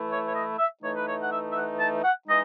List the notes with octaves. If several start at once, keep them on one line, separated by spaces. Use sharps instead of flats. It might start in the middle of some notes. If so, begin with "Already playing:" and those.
Already playing: E3 A3 E4
C#5
C#5
D#5
E5
E3 A3 D#4 C#5
B4
C#5
F#5
E5
E5
F#5
A5
F#5
E3 G#3 D#4 D#5